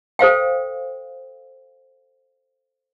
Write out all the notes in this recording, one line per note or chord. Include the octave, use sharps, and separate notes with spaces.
A4 C5 F5 G5